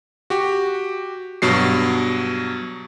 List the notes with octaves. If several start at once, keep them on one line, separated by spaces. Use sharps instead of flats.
F#4 G4
G2 B2 F#3 C7